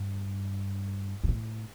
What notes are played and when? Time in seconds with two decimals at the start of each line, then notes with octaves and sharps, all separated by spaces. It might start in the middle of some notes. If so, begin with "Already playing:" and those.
Already playing: G2
1.24 G2
1.28 A2